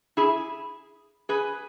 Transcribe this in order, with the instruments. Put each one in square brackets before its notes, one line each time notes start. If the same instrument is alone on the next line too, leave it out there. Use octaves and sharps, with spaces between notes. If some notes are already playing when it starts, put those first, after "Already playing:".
[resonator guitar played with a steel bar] E4 G#4
G#4 B4